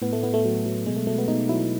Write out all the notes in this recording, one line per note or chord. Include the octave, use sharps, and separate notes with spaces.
A2 B3
A3
A2 B3
A3
F#3
F#3
B2 G#3
A3
B2 A3
B3
B2 D#4
F#3 E4